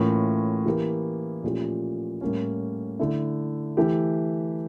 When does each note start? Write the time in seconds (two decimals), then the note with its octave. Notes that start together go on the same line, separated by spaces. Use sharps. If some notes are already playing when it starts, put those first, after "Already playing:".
Already playing: A2 E3 A#3 C#4 F4
0.66 E3 A#3 E4 G4
1.43 A#2 F3 A3 C#4 G4
2.21 A2 G3 A#3 C#4
2.99 D3 A3 E4
3.77 E3 A3 E4 G4